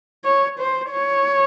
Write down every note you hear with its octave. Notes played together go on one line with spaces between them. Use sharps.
C#5
C5
C#5